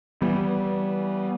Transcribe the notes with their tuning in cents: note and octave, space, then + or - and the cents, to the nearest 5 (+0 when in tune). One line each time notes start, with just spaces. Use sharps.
E3 +0 G3 -20 B3 -15